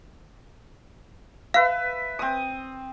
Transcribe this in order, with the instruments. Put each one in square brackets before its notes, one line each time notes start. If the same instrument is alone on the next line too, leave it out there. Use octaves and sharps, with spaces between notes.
[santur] B4 E5 [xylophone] F5
[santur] C4 D#6